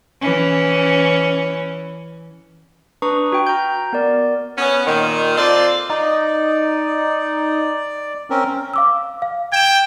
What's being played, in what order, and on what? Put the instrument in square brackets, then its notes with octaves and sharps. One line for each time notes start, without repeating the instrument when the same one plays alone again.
[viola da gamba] E3 C#4
[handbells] D4 B4 A#5 C#6 D#6
F#4 G5 G6
A#5 F6 G6
B3 A#4 D5
[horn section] B3 C#4
A#2 D#3
C4 F4 A4 C5 D5
[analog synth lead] D#4 [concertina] D5
[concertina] C4 C#4 A#4
[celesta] F5 D6 E6
F5
[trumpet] G5 [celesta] G#6 E7